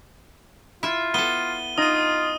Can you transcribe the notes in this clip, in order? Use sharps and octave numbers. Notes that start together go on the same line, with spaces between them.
E4 F4 E5
B3 A4 D#7 G7
D#4 F4 D#5 D#6 D#7